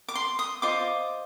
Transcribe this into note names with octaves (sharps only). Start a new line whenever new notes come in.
D6
C6
D#6
F4 C5 D#5 D6